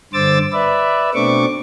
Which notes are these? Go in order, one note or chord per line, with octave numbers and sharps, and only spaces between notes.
G2 D3 C5 D6 E6 A6
B4 D5 E5
B2 A3 C4 D4 C#6 D6